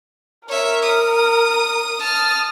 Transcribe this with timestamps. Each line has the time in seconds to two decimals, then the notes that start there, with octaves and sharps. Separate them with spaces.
0.49 A#4 C#5 E5
0.82 D#6
2.00 A5 D#6 F6